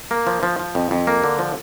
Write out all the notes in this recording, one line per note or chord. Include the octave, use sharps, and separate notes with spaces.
A#3
F3
F3
F3
F2
F2
A#3
D3
F3